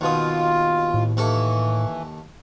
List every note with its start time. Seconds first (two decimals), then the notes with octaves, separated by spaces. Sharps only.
0.01 D#2 B2 F4 D#6
0.94 A2
1.17 D#2 E3 A4 C#6